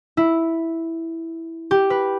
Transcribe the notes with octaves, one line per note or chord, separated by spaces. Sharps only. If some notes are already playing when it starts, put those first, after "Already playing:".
E4
G4
B4